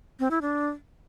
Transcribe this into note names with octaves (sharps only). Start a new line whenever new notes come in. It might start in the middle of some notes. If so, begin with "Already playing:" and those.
C4
E4
D4